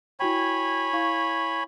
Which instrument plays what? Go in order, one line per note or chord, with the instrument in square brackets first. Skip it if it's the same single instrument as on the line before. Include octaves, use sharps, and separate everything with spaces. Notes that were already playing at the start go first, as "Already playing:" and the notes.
[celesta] E4 F#4 G5 [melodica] C#5 G#5 B5
[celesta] E4 F5 C#6